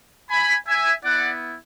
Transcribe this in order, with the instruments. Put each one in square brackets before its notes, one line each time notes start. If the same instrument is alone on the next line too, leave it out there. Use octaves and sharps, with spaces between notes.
[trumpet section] G#5 B5
E5 G#5
B3 E4 D5 F#5